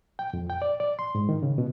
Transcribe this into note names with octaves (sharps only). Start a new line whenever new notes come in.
G5
F2
G5
D5
D5
C6
G#2
D#3
C#3
B2